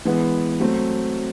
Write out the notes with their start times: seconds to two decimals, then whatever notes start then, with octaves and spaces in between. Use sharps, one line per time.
0.05 E3 G#3 B3
0.60 F#3 A3 C4